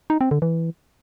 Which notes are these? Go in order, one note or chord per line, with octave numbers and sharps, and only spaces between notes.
D#4
C4
D3
E3